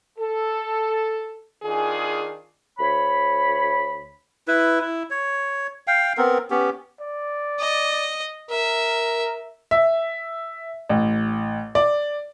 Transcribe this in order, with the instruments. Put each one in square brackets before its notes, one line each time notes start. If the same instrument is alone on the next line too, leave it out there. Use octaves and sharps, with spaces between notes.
[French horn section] A4
D#3 D4 F4 G#4
[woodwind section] D2 C#5 B5
[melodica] E4 B4
E4
C#5
F5 G5
B3 C4 A#4
B3 C#4 G4
[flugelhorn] D5
[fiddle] D#5
[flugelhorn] A#4 [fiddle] E5
[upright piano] E5
A1
D5